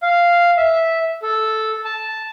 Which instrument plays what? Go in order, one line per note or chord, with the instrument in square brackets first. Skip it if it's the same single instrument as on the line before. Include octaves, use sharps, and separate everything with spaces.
[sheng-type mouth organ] F5
E5
A4
A5